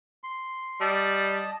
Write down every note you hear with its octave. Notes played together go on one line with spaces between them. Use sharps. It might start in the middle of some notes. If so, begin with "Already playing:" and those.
C6
G3 D#5 A5